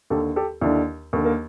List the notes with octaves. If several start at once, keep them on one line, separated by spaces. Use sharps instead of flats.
D#2 D3 G4 A4
G4 A4
D#2 D3 D4 E4
D#2 D3 A#3
A#3